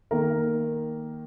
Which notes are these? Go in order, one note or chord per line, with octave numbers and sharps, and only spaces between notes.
D#3 A#3 A#4